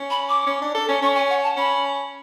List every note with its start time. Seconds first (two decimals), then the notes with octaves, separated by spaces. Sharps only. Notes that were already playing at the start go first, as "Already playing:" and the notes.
Already playing: C#4
0.10 B5
0.29 D6
0.47 C#4
0.62 D4
0.75 A4
0.89 C#4
1.02 C#4 C#6
1.16 G#5
1.30 F#5
1.43 A5
1.57 C#4 B5